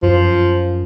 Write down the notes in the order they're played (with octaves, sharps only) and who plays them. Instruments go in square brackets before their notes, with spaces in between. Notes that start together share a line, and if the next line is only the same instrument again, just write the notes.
[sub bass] F#2 [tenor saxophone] F3